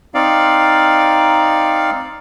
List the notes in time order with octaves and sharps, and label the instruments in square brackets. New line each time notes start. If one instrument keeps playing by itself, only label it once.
[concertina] C4 D#4 D5 F5